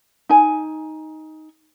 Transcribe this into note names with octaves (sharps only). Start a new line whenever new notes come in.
D#4 G#5